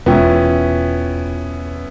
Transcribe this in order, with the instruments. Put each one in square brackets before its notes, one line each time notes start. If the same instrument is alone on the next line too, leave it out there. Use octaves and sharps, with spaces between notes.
[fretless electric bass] E1 [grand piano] B3 C#4 E4 [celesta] F4 G5